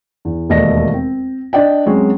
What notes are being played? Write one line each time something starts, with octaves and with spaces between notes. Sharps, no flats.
E2
E1 D#2 A3 D5 D#5 A#6
C4
D4 D5 D#5 G5
F#3 G#3 C4 C#4